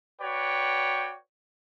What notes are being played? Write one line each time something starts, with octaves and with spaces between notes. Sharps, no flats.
F#4 B4 C#5 D5 G5